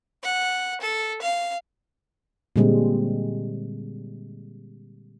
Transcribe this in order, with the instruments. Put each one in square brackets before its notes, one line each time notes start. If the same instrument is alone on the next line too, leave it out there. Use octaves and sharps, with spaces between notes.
[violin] F#5
A4
F5
[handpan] A#2 D3 G3 G#3 C4